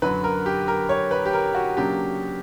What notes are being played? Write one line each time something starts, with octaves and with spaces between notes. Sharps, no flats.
F#2 D3 F#3 B4
A#4
G4
A#4
C#5
B4
G4
A#4
F#4
C#3 F#3 A#3 D4 G4